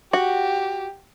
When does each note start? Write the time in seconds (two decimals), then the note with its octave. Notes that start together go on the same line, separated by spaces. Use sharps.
0.13 F#4 G4